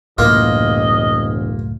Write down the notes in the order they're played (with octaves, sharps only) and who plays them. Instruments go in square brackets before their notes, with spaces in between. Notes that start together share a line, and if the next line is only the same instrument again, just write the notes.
[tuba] E1 [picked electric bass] C#2 F#2 A2 [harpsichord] A#3 F4 [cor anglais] D#5